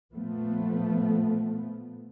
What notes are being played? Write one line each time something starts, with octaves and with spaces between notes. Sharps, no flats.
A#2 F3 A3 B3